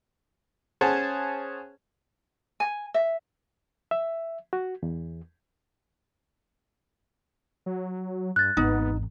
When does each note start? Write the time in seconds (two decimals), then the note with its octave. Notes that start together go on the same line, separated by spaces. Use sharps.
0.81 C#4 G#4 C5 C#5 F#5 A5
2.60 G#5
2.94 E5
3.91 E5
4.53 F#4
4.83 E2
7.66 F#3
8.36 G2 F#6 A6
8.57 G#1 E2 B3 D#4